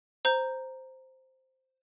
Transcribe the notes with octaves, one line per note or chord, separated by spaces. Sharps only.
C5 A#5 G6